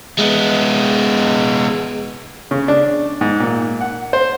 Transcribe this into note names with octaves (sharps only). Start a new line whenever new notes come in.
G#3 B3
C#3
D4
G#2
A#2
F#5
C5